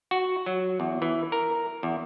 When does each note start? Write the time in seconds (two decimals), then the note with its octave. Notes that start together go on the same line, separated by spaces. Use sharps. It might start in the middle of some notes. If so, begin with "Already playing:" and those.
0.11 F#4
0.46 F#3
0.80 E2
1.02 E3
1.32 A#4
1.83 E2